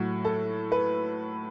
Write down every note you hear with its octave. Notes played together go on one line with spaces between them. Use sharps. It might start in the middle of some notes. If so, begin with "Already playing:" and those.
Already playing: A2 F#3 F#4
A4
B4